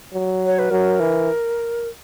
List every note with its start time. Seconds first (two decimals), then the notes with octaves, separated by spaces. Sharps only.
0.13 F#3
0.46 C#5
0.59 B4
0.70 F#3 A#4
1.00 E3